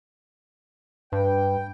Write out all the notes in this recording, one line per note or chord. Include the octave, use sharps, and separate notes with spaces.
G2 B4 G5